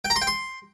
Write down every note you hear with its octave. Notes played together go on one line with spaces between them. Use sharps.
G5
A#5
C6
G5
C6